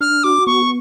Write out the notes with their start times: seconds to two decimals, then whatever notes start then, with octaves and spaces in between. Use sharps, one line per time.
0.01 D4 F6
0.24 F#4 D6
0.46 B3 C#6